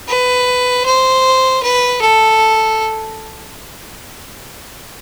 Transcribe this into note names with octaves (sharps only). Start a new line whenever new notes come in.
B4
C5
B4
A4